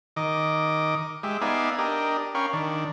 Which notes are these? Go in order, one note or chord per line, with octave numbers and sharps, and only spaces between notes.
D#3 D#5 D6
G#3 G4 E5
B3 D#4 D5 E5 F5 G#5
D4 G4 A#4 D#5
C#4 A#4 F5 G5 B5 C#6
D#3 D4